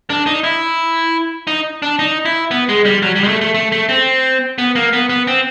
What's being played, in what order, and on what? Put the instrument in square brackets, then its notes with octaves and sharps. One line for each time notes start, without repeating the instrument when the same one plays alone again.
[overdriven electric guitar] D4
D#4
E4
D#4
D4
D#4
E4
B3
G#3
G3
F#3
G3
G#3
A3
A3
A3
A3
C4
B3
A#3
B3
B3
C4